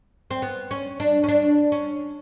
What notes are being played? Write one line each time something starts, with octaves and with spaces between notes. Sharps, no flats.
C4
B3
C#4
D4
C#4
D4
C#4